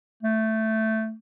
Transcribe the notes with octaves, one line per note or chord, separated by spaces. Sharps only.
A3